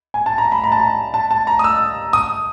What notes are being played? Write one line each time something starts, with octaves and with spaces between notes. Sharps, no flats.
G#5
A5
A#5
B5
A#5
A5
A#5
A5
A5
A#5
D#6
E6
D#6